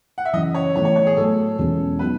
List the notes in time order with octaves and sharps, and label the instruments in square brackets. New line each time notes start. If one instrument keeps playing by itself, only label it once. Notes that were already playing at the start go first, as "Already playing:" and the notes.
[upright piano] F#5
E5
[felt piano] F#2 C#3 E3 [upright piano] D#5
[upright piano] C#5
[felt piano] A2 E3 B3 E4 [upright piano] C#5
[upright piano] C#5
C#5
G#4
[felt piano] A2 F#3 A3 [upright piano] A4
[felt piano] E2 B2 G#3 C#4
[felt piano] F#3 B3 D#4 [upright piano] B4